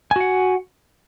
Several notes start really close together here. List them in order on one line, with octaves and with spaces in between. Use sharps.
G#5 F#4 F#5